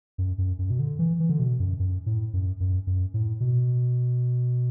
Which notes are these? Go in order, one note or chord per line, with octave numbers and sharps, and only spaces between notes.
F#2
F#2
F#2
B2
D3
E3
E3
D3
B2
F#2
F#2
A2
F#2
F#2
F#2
A2
B2